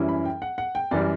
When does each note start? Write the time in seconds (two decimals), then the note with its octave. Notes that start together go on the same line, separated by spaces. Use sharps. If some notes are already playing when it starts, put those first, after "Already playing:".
Already playing: F#2 E3 G3 C#4 E4
0.09 B5
0.25 G5
0.42 F#5
0.58 F#5
0.75 G5
0.91 F#2 E3 G3 D5